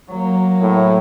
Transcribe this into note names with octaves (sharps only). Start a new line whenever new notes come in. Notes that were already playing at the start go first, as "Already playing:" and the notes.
F#3 A#3
A2